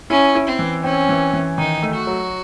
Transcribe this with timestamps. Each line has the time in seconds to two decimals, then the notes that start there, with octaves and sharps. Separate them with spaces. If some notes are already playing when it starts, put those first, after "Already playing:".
0.10 C#4 E4
0.35 E4
0.47 C4
0.59 E3
0.84 C4 C#4
1.09 E3
1.33 E3
1.58 D#3 D#4
1.82 A3
1.95 F#4
2.07 F#3